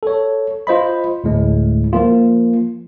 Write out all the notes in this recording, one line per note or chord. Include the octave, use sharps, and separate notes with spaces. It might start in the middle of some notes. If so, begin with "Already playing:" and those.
A4 C#5
F4 C5 D#5 B5
D2 A2 G#3
F3 A#3 F4